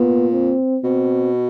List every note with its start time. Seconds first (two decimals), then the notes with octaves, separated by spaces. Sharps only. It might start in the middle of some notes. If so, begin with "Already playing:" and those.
Already playing: A#2 B3
0.33 C4
0.84 B2 C4